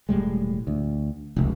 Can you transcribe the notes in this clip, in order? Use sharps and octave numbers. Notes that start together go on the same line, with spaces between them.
E1 A2 G3 G#3
D2
F1 C#2